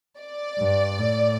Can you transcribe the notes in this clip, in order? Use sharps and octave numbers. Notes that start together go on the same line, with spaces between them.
D5
G2
A2